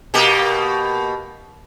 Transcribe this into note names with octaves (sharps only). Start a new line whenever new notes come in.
B2 A#3 G4